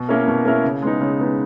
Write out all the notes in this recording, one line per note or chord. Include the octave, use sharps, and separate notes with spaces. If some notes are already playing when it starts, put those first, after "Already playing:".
Already playing: B2
A#3 C#4 E4 A#4
B2
A#3 C#4 E4 A#4
C#3
G#3 B3 D#4
C#3
G#3 B3 D#4